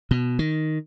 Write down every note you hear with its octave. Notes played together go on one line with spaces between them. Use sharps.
B2
D#3